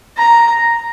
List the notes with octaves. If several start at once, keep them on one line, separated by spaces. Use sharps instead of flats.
A#5